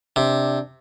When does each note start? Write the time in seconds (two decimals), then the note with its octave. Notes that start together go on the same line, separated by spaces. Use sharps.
0.16 C3 D4